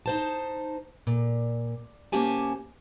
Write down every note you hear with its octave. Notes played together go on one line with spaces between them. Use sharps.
D#4 C5 A5
A#2
C3 A#3 C#4 G4 G#5 A5